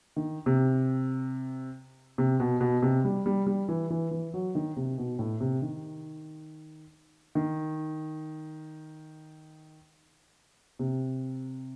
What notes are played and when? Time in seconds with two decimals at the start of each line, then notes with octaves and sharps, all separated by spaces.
0.16 D#3
0.46 C3
2.18 C3
2.40 B2
2.61 B2
2.82 C3
3.05 G3
3.26 G3
3.47 G3
3.68 E3
3.90 E3
4.11 E3
4.34 F#3
4.55 D#3
4.76 C3
4.98 B2
5.19 A2
5.41 C3
5.62 D#3
7.35 D#3
10.79 C3